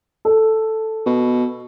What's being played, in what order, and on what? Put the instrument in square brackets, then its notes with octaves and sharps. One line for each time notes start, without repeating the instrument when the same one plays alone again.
[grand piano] A4
[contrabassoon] B2